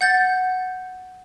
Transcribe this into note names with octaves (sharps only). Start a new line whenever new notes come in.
F#5 G6 A6